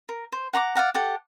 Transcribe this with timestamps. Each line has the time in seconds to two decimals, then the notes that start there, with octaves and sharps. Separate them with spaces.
0.09 A#4
0.32 C5
0.53 F#5 A#5 C6 D6
0.75 D5 F5 F#5 A#5
0.94 G4 A4 F#5